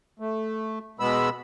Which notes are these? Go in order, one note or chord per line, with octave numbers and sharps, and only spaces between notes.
A3
B2 G#3 B3 B5 E6